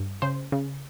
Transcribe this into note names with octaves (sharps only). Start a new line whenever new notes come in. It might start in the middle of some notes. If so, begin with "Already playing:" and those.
Already playing: G2
C#3 C5
C#3